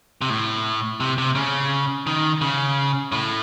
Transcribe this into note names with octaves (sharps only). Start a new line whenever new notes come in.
C3
A2
C3
C3
C#3
D#3
C#3
A2